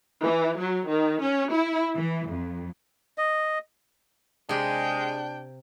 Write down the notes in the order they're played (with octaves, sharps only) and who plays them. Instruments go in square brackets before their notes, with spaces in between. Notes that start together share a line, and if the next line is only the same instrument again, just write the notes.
[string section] E3
F#3
D#3
C#4
E4
E3
F2
[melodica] D#5
[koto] C3 G4 [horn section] G#3 [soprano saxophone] D4 [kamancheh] G5